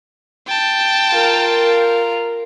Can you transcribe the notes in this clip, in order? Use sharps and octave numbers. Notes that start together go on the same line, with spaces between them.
G5 A5
F4 A#4